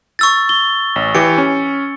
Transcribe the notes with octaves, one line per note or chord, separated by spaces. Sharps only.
C#6 E6 A6
G7
A1
E3 G4 C#7
C#4